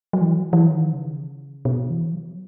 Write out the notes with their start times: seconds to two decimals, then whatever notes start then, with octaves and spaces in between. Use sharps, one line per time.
0.13 F#3
0.21 E3
0.38 F#3
0.53 E3
0.70 D#3
0.93 C#3
1.65 B2
1.90 E3
2.13 F#3